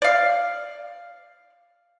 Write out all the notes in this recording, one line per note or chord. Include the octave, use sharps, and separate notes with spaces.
D5 F5